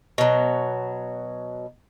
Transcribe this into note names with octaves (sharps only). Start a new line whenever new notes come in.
B2 F#3